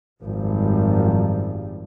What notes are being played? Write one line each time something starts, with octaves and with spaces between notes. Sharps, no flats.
G#1 F#2 F3 G3